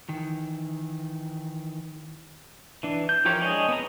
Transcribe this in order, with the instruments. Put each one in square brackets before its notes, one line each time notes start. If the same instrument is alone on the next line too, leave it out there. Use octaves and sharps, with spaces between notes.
[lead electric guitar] D#3 E3
[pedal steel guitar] E3 D4
G6
E3 F3 G4 A#4 C#5
G#3 D4 G#4 C#5 D#5
B3 C4 A#5